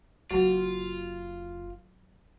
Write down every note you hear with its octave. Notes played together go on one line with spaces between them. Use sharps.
F#1 F#3 F4 F#4